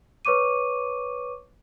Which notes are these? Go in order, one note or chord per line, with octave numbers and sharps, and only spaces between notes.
B4 C#5 C#6 D6 D#7